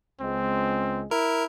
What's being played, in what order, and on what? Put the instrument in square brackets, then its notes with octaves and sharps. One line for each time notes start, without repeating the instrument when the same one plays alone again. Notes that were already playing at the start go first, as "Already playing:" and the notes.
[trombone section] C#2 G#3 [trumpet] C4
[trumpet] E4 [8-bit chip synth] A#4